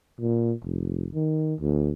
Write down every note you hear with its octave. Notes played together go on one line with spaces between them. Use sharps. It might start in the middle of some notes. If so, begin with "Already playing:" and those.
A#2
F1
D#3
D2